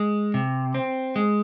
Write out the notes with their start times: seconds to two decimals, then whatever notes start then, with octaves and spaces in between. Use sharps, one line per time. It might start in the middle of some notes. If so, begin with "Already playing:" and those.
Already playing: G#3
0.34 C3
0.74 C4
1.16 G#3